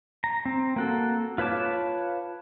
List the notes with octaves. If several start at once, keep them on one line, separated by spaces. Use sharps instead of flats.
A#5
C4
A#3 F#4 A4
F4 B4 C#5 A5 D6